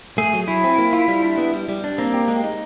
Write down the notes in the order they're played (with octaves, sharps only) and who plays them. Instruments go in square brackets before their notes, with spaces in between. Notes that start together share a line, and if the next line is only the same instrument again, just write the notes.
[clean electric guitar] A3 [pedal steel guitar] G#4
[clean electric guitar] F#3
[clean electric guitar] F#3 [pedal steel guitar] E4
[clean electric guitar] C4
A#3
F4
G3
D4
B3
G3
G3
D4
[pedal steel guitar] A#3 [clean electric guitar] C4
[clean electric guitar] G4
G#3
D#4